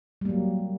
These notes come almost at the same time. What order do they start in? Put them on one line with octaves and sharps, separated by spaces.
G3 A#3 F#3